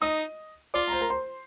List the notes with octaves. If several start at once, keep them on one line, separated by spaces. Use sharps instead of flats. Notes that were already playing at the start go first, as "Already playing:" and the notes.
D#4 D#5 D#6
F4 D5 D6
A#5
C5 C6
A#4 A#5
C5 C6